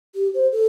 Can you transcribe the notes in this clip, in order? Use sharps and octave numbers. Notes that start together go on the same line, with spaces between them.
G4
C5
A4